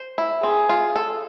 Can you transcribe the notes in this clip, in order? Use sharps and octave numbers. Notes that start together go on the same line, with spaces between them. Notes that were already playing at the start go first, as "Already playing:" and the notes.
Already playing: C5
E4
C4 G#4
F4
A4